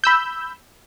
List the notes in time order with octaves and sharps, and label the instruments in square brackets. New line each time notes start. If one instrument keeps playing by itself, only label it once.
[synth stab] B5 E6 G6